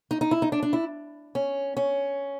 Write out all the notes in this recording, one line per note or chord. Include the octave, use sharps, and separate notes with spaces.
D#4
D#4
E4
D#4
D4
D4
E4
C#4
C#4